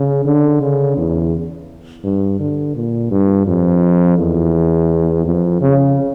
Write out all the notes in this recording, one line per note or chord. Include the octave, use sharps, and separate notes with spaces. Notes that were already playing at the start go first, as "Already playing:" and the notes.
Already playing: C#3
D3
C#3
E2
G2
D3
A#2
G2
F2
E2
F2
C#3